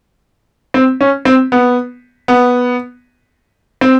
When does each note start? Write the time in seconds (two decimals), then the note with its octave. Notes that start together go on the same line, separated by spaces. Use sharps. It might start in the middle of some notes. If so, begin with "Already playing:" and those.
0.74 C4
1.01 C#4
1.25 C4
1.52 B3
2.28 B3
3.81 C4